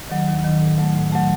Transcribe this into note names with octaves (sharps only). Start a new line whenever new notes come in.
D#3 F#3
D#2
D#3 F#3
A2
F#3 A3
A2
F#3 A3